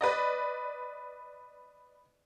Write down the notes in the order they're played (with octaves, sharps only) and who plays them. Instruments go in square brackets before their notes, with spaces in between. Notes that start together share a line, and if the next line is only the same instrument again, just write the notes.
[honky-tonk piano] B4 D5 D#5